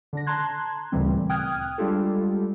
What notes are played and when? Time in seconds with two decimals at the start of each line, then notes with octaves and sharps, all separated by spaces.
0.13 D3 D4 A#6
0.26 A5 A#5 C6 F#6 G#6
0.92 D2 A#2 C#3 E3 G3 C4
1.29 G5 D#6 F6 F#6 G#6
1.78 G3 G#3 D4 F4 G4 A4